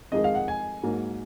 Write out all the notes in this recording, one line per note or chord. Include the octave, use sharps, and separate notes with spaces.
F2 D#3 G#3 D#4 G#4 D#5
F5
F#5
G#5
G#2 F#3 A#3